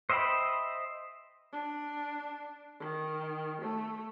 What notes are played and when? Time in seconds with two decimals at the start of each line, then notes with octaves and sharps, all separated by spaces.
0.10 C5 D#5 E5 G5 B5
1.53 D4
2.80 D#3
3.62 A3